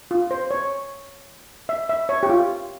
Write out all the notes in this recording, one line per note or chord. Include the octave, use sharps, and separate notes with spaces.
F4
C5
C#5
E5
E5
C#5
G4
F4